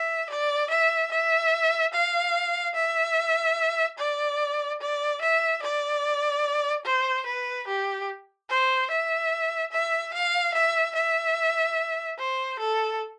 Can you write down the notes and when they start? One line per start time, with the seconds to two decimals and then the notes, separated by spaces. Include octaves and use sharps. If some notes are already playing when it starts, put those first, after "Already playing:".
Already playing: E5
0.30 D5
0.71 E5
1.12 E5
1.94 F5
2.76 E5
3.99 D5
4.81 D5
5.22 E5
5.63 D5
6.85 C5
7.27 B4
7.68 G4
8.50 C5
8.91 E5
9.72 E5
10.14 F5
10.55 E5
10.95 E5
12.19 C5
12.60 A4